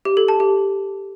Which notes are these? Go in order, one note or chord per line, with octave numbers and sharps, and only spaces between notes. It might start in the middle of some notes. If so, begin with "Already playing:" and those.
G4
A4
A5
G4